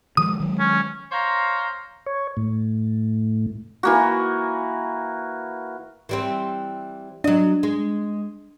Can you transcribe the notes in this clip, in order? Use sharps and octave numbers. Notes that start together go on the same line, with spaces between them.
D#3 F3 G#3 D#6
D#3 F#3 G#3
C#4
C5 C#5 F5 A#5
C#5
A2
E3 A#3 F#4
E3 G3 C4
F#3 D4 D#5
G#3